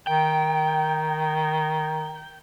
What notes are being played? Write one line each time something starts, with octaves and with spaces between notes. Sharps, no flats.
D#3 G5